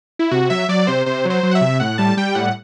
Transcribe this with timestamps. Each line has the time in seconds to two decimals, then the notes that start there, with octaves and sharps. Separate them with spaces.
0.19 E4
0.31 C3 F#4
0.50 F#3 E5
0.69 F#3 D5
0.87 C3 C5
1.06 C3 C5
1.25 F#3 C5
1.43 F#3
1.51 F#5
1.55 E5
1.61 C3
1.80 A2 F#5
1.98 G3 A5
2.17 G3 G5
2.35 A2 F#5